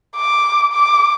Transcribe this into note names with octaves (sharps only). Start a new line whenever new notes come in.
D6
D6